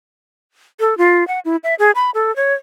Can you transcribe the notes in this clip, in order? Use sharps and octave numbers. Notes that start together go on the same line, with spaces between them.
A4
F4
F#5
E4
E5
G#4
B5
A4
C#5